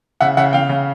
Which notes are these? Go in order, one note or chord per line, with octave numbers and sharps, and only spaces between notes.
C#3 E5 F#5
C#3 E5 F#5
C#3 F5 G5
C#3